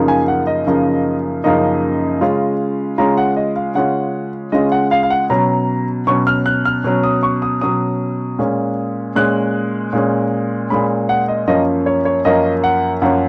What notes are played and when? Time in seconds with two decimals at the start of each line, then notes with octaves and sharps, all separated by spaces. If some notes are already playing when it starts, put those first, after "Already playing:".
Already playing: F#2 C#3 F3 A#3 D#4
0.08 G#5
0.28 F#5
0.47 D#5
0.66 F#2 C#3 F3 A#3 D#4
1.44 F#2 C#3 F3 A#3 D#4 D#5
2.21 C#3 G#3 C#4 F4
2.98 C#3 G#3 C#4 F4 A#5
3.17 F#5
3.37 D#5
3.56 F5
3.75 C#3 G#3 C#4 F4 F#5
4.52 C#3 G#3 C#4 F4 D#5
4.72 F#5
4.91 F5
5.03 F5
5.10 F#5
5.30 B2 F#3 C#4 A#5
6.07 B2 F#3 C#4 C#6
6.27 F6
6.46 F#6
6.65 F6
6.84 B2 F#3 C#4
7.03 D#6
7.23 C#6
7.42 D#6
7.61 B2 F#3 C#4 D#6
8.39 A#2 G#3 C#4
9.16 A#2 G#3 C#4 F#6
9.93 A#2 G#3 C#4
10.70 A#2 G#3 C#4 B5
11.09 F#5
11.28 D#5
11.47 F#2 F3 A#3 C#4 D#5
11.86 C#5
12.05 C#5
12.25 F#2 F3 A#3 C#4 D#5
12.64 F#5
13.02 F#2 F3 A#3 C#4 F#5